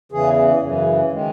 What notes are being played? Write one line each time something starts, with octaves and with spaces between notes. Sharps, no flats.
E2 C#3 E3 G#4
F#2 C#3 E3
D#3 G#3